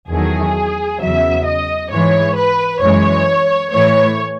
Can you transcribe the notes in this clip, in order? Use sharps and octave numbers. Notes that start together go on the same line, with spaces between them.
E2 D#3 F#3 A3 G#4
E2 C#3 F#3 E5
D#5
G#2 E3 G#3 C#5
B4
F#2 E3 G#3 C#5
A2 E3 A3 C#5